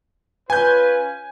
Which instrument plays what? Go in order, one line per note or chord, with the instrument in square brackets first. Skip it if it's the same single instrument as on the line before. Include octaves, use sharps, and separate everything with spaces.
[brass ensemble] C#4 F4 B4 [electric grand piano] G#5 G6